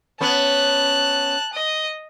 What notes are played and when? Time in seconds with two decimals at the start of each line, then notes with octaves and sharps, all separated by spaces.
0.21 B3 C#4 A5 F#6
1.53 D#5